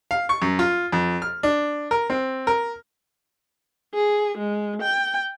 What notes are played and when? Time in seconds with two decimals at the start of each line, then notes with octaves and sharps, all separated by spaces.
0.11 F5
0.29 C#6
0.42 F#2
0.59 F4
0.92 F2
1.22 F6
1.43 D4
1.91 A#4
2.10 C4
2.47 A#4
3.94 G#4
4.38 G#3
4.82 G5